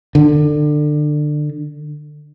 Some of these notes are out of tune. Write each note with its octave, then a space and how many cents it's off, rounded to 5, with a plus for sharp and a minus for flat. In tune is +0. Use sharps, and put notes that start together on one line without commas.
D3 +25